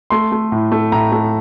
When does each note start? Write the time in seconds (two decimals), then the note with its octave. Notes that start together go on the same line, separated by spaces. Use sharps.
0.10 A3 C6
0.32 A3
0.52 A2
0.72 A3
0.92 A2 A#5
1.12 A3